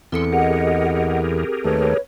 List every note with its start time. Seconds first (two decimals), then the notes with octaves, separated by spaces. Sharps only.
0.12 E2 C4 A4 C6 E6 C#7
0.33 G4 G#4 A#4 D#5 F#5
1.64 D#2 A3 B4 C#5